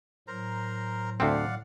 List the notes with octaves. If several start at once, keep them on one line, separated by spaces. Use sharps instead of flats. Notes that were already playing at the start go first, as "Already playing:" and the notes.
A2 F#3 A#4 C5 A#5
D2 C4 D5 F5 F#5